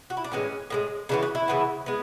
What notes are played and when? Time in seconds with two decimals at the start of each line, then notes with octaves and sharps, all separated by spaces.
0.10 F#4
0.17 E4
0.24 D4
0.32 A2 E3 G#3 C#4
0.70 A2 E3 G#3
1.09 C#3 E3 B3 D4
1.23 F#4
1.35 E4
1.48 C#3 E3 B3
1.86 G#3 B3